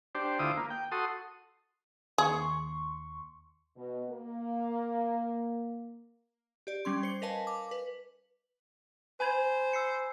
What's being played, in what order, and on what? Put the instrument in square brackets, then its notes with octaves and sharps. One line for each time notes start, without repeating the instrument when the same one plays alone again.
[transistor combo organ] D4 G4 C5
D2 E4 F4 C5 D6 D#6
A#3
G5
F#4 A4 C6 D#6
[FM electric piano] D#2 C6 C#6 [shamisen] G#4
[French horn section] B2
A#3
[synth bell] G4 D5
G3 C#4 C6
C5 C#7
A#4 B4 D#5 F5 G#5 A5
D6
B4
[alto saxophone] C5 [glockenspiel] G#5 B5 G#6
[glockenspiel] E6 C7 C#7